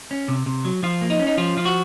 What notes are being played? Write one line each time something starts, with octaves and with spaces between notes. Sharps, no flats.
C#4
C3
C3
F#3
F3 F4
A#3
D#4
C#4
D#4
F3 F4
F3 F4
F#4